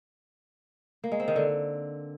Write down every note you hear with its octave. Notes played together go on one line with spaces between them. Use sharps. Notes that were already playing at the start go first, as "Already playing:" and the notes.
A#3
G#3
C4
D#3
D3